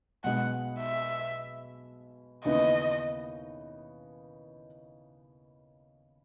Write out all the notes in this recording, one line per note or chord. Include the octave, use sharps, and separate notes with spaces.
B1 B2 G#3 F#5
E5
D#2 C#3 E3 B3 D#4 D#5